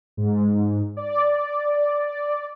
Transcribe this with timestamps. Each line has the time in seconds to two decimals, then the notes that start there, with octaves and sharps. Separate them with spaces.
0.17 G#2
0.97 D5